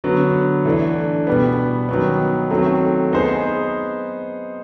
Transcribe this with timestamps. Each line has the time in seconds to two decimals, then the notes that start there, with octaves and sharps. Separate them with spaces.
0.04 D3 F#3 B3
0.65 E3 A3 D4
1.27 B2 G3 B3
1.89 D#3 F#3 B3
2.51 D#3 F#3 A3 C4
3.12 B3 D#4 G#4 C5